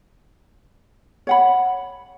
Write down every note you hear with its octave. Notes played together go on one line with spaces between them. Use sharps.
C#5 F#5 B5